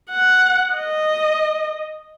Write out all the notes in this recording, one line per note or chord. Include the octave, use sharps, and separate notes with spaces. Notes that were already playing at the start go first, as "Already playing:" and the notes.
F#5
D#5